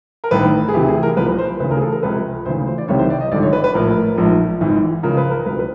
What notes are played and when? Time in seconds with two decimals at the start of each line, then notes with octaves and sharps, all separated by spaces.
0.24 A#4
0.31 A1 G2 D#3 B4
0.68 G#4
0.74 D2 C3 E3 G4
0.88 G#4
1.03 A#4
1.17 C2 A#2 F3 B4
1.38 C5
1.60 D2 C#3 E3 B4
1.71 A#4
1.77 G#4
1.82 A4
1.92 A#4
2.03 C#2 C3 F3 B4
2.45 D2 C#3 E3 C5
2.67 C5
2.78 D5
2.88 C2 C3 D#3 C#5
2.99 C5
3.10 D5
3.21 D#5
3.32 G#1 G2 D3 F3 D5
3.43 C#5
3.53 B4
3.64 B4
3.74 A#1 A2 F3 A#4
4.18 A#1 G#2 F3
4.60 G#1 G#2 E3
5.03 C#2 C#3 F3 A#4
5.17 B4
5.31 A#4
5.46 C2 B2 B4
5.59 B4